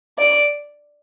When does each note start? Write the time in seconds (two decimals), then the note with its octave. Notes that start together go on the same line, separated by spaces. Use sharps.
0.18 D5